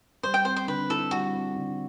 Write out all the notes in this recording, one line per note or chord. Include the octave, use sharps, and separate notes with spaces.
G3 C5
G5
C4 C5
C5
D3 B4
E4 A4
G3 F#4
C4
D3